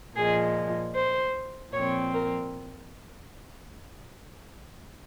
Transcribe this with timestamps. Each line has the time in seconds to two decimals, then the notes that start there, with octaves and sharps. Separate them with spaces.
0.16 A#2 F3 G#3 G#4
0.95 C5
1.72 A#2 F3 C4 C#5
2.13 A#4